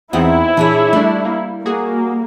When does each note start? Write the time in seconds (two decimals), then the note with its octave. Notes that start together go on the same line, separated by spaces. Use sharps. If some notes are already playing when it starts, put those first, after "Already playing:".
0.13 E2 B3 C4 D#4 E4 F#5
0.57 A#2 E3 D4 G#4 C#5
0.93 G3 A3 D4
1.25 A#3
1.66 A#3 F#4 G#4